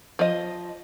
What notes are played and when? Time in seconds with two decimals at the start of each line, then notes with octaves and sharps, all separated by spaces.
0.19 F3 D#5